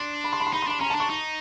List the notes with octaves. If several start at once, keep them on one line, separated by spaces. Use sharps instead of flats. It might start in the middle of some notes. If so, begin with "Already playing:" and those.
Already playing: D4 C6
B5
C6
B5
C6
D#4 B5
C6
D4 B5
C#4 A#5
A5
D4
C#6
D#4